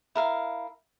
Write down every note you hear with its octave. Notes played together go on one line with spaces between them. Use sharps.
E4 A#4 F5